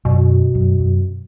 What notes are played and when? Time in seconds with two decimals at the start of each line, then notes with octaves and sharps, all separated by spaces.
0.05 F#2 B2
0.55 F#2
0.80 F#2